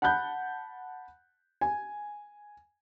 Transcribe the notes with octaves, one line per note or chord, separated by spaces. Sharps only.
F#5 A5 B5 F#6 G6
G#5